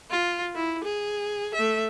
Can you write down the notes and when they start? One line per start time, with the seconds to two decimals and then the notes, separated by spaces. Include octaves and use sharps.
0.11 F4
0.55 E4
0.84 G#4
1.54 A3 E5